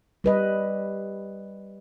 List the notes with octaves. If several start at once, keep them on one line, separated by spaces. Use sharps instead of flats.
G3 B4 D#5